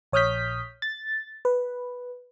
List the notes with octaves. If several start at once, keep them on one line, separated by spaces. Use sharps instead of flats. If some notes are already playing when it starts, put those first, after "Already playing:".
A#1 C#5 D#6 F6 G6 B6
A6
B4